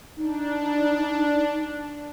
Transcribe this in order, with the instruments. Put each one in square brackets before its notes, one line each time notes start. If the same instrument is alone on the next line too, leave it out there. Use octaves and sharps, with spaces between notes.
[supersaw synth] D4 [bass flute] D#4